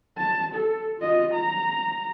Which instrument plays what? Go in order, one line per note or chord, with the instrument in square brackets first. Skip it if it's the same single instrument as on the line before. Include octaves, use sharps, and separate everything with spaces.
[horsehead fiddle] A5
A4
F4 D#5
A#5